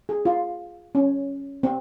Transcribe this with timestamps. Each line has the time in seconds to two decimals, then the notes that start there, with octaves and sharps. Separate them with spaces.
0.09 G#4
0.25 F4
0.95 C#4
1.63 C4